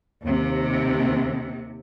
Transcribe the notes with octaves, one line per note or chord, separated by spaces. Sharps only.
D#2 C3